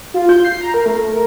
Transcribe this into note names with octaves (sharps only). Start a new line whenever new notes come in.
F4
G6
C7
A#5
A#4
A3
A#4